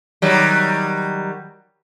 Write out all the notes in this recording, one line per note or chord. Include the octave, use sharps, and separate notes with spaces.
D#3 F#3 G3